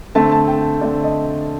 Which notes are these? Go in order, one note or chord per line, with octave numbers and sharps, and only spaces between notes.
D3 A3 C4 A5
A5
G5
D3 A3 C4 D5
D#5